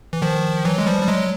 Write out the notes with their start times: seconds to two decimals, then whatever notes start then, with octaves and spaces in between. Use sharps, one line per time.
0.13 E3
0.22 D#3 F3
0.65 E3 F#3
0.78 G#3
0.86 F3 G3
1.02 G3
1.08 F#3 G#3